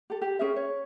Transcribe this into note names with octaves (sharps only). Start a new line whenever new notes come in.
G4 A4
G4
C#4 G#4 A#4 E5
C#5